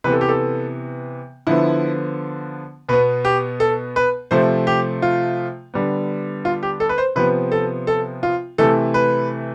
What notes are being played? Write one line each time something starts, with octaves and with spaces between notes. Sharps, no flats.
C3 E3 B3 B4
A4
G4
A4
D3 F3 B3 E4
B2 B3 B4
G4
A4
B4
C3 F3 A3 C5
G4
F4
D3 G3 B3
F4
G4
A4
B4
C5
C3 F3 B3 B4
A4
A4
F4
C3 E3 A3 A4
B4